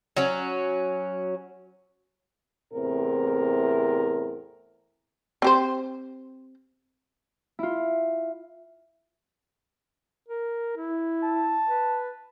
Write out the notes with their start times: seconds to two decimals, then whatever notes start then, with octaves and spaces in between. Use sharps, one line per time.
0.17 F#3 C#4
2.73 E2 A2 C3 C4 A#4
5.42 C4 G4 C5
7.59 E4 F4
10.28 A#4
10.77 E4
11.23 A5
11.68 B4